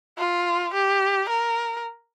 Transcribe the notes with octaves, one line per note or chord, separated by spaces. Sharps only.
F4
G4
A#4